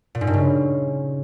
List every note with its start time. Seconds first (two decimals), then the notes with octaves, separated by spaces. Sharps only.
0.15 A#2
0.21 G#2
0.27 G2
0.34 C#3